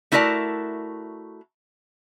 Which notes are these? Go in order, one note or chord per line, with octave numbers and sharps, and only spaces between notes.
A3 E4 F#4 A#4 D5 A5